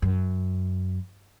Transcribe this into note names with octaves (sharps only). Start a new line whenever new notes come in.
F#2